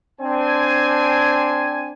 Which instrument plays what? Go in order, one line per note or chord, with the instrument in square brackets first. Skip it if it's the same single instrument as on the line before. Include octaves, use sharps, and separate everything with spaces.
[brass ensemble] C4 D4 G#5